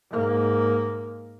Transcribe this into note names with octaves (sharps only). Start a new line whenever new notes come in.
G#2 A#3